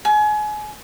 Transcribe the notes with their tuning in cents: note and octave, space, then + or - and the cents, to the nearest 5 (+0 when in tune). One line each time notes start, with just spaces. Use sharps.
G#5 +30